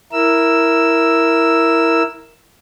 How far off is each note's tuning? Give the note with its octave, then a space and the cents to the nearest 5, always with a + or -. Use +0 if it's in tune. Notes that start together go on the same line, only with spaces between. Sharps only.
E4 +0 A#4 +0 E6 +5